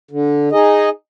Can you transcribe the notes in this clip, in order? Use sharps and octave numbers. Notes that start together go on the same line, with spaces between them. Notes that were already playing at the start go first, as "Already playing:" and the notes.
D3
D#4 G#4 D#5